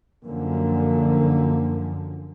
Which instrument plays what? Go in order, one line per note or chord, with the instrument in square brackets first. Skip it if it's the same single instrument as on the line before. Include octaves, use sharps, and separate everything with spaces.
[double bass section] F#2 D3 F3 [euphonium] A#3